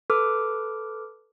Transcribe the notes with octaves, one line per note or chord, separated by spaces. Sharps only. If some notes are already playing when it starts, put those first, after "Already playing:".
A4 B4 D6 F6